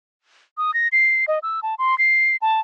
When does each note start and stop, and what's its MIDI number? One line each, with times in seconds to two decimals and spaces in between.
0.58 0.74 87
0.74 0.88 94
0.92 1.25 96
1.28 1.39 75
1.43 1.60 88
1.63 1.75 81
1.78 1.97 84
1.98 2.36 96
2.42 2.60 81